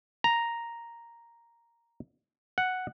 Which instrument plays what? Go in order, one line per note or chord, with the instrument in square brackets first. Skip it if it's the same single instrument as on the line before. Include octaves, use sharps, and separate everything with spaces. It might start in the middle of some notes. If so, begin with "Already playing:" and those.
[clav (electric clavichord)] A#5
F#5